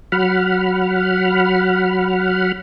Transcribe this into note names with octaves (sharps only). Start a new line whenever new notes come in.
F#3 F#5 B5 F6